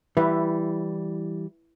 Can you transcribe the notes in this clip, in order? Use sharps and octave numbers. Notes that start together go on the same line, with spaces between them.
E3 G3 E4 B4 E5